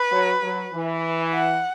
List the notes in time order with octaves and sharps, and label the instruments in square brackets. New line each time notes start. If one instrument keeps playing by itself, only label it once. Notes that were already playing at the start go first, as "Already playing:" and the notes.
Already playing: [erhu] B4
[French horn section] F#3
F#3
E3
[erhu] F#5